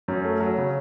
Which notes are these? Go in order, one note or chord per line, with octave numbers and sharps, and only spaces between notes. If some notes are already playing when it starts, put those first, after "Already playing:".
F#2 C#4
A3
F#3
C#3